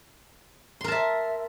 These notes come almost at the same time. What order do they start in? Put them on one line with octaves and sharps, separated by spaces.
C6 A#4 A5 E5